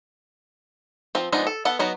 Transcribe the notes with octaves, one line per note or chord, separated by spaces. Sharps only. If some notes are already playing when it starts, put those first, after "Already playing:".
F3 C4
F3 G#3 B3 D4 D#4
A4
B3 A4 F#5
F#3 B3 D#4